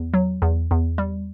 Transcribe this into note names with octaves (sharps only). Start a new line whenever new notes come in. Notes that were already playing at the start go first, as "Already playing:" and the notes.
Already playing: E2
F#3
E2
E2
G3